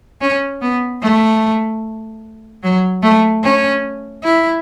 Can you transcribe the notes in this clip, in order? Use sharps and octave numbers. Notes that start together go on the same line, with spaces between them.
C#4
B3
A3
F#3
A3
C#4
E4